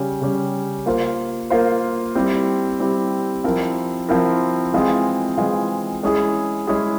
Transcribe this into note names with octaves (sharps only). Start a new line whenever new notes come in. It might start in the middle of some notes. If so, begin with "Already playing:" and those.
Already playing: C#3 G3 C#4 G4
C#3 G3 C#4 G4
A#3 F4 C5
A#3 F4 C5
G3 C4 E4 G4
G3 C4 E4 G4
F3 C4 E4 A#4
F3 C4 E4 A#4
E3 G#3 C4 F4 G#4
E3 G#3 C4 F4 G#4
G#3 C#4 E4 G#4
G#3 C#4 E4 G#4